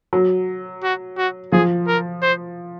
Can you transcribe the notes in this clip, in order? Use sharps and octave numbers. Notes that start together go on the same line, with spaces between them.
F#3
F#4
F#4
F3 G#4
A#4
C5